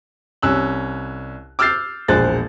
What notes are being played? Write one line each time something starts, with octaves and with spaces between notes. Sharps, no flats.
C2 C#4 E6 F#6
D6 E6 F6 G6 A6 C7
E1 A#1 C5 F#6 A6